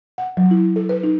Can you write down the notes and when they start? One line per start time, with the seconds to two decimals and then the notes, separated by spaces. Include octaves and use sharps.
0.18 F#5
0.37 F#3
0.51 E4
0.76 A4
0.89 B4
1.04 D#4